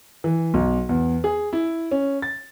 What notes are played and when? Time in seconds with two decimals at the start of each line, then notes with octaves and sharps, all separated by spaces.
0.24 E3
0.54 B1
0.89 E2
1.24 G#4
1.53 E4
1.91 C#4
2.22 A6